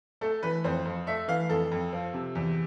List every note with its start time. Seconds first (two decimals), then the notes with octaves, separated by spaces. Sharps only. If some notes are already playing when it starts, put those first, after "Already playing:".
0.21 A3 A4
0.43 E3 B4
0.64 F2 C5
0.85 F2
1.07 A3 E5
1.28 E3 F5
1.49 F2 A4
1.72 F2
1.93 F3
2.14 C3
2.35 E2